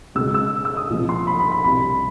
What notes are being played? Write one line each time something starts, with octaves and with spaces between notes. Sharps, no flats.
C#2 B2 G#3 E6
E6
E6
D#6
C2 A#2 F3
C6
B5
B5
B5
C2 B2 G3 B5